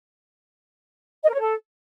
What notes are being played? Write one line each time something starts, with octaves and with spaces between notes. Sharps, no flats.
D#5
A#4
C#5
A4